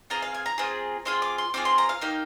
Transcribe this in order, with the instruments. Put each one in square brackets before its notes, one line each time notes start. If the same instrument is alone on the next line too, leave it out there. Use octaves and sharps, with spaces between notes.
[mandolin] C4 F4 G#4 A#5
F5
G#5
A#5
C4 F4 G#4
C4 F4 G#4 C6
D6
C6
C4 F4 G#4 D6
C6
A#5
F5
A#3 D#4 G4